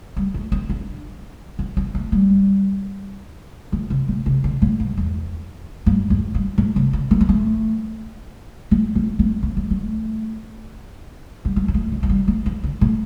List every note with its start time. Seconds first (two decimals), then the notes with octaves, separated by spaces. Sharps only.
0.17 G3
0.34 A3
0.52 C4
0.70 D4
1.59 C4
1.77 C4
1.95 A3
2.12 G3
3.72 D3
3.90 C3
4.08 A2
4.26 C3
4.44 D3
4.62 A2
4.80 G2
4.97 E2
5.86 G2
6.10 E2
6.35 G2
6.58 A2
6.76 C3
6.93 D3
7.11 E3
7.21 C4
7.29 A3
8.71 C4
8.95 C4
9.19 C4
9.43 A3
9.57 C4
9.70 A3
11.45 G3
11.56 A3
11.68 C4
11.74 A3
11.92 A3
12.03 A3
12.09 G3
12.28 E3
12.46 E3
12.63 D3
12.81 A2